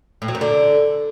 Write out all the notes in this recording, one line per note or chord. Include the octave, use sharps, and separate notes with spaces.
A2
F#3
F#2
D3